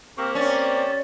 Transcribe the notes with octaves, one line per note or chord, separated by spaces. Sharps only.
A#3 C4 G4 A#4 C#6
C#4 D5